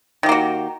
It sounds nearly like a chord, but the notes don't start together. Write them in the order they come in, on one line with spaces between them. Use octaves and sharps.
D#3 G4 A#3 F#4